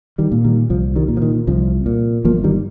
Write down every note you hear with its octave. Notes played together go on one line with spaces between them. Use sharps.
D#3 G3
A#2
D#3 G3
C2 F3
D#3 G3
A#2
F3
D#3
C2 F3
A#2
G1 F3 A#3
D#3 G3